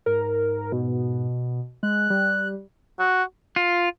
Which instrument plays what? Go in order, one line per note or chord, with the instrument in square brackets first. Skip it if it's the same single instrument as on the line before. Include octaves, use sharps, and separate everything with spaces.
[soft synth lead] G#2 [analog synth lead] A#4
[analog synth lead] B2
[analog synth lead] G#3 [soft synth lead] F#6
[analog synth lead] G3
[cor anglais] F#4
[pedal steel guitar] F4